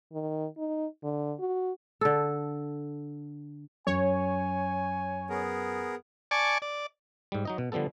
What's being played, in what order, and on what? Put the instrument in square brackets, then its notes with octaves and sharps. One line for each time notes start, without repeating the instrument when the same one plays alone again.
[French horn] D#3
D#4
D3
F#4
[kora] D3 A4
[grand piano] F#2 [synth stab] C#5 [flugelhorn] G#5
[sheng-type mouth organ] B3 G#4 A#4
[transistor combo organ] D5 G#5 A5 C#6 D6
D5
[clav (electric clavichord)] G#2 G3
F#3 D#4 D#5
B2
D3 F3 G3 B3 A4